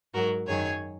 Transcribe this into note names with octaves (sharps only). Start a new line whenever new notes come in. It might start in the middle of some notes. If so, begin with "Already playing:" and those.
G#2 F#3 F#4 A#4
F#2 D#3 F#3 G#4 C#5